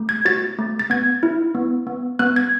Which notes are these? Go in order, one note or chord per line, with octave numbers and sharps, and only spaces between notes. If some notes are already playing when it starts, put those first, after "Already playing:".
Already playing: A3
G#6
F#4 A6
A3
A6
B3 G#6
E4
B3
B3
B3 F#6
G#6